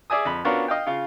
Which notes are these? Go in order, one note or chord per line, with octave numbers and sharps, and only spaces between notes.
G#4 D5 E5 G#5 D#6
F2 B5
B3 C#4 D4 F4 F#4 A#4
D#5 F5 G5
C#3 F4